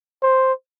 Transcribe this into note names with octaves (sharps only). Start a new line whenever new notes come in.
C5